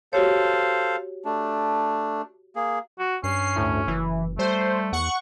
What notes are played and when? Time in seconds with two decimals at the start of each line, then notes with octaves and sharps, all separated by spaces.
0.13 F#4 G4 A4 C5 C#5 F5
1.25 A3 D4
2.56 A#3 G#4
2.99 F#4
3.24 G2 C#4 C7
3.56 D2 A2
3.87 F#1 E3
4.39 G3 A3 C5
4.92 E2 F#5 C#6